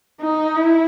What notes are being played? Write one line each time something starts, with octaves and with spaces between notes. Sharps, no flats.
D#4
E4